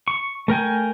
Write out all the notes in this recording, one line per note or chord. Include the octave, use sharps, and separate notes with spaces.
C#6
A3 A#4 G5 G#5